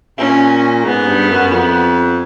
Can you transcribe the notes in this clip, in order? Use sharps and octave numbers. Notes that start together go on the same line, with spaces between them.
A#2 C#4
G#2 B3
G2
F#2
F2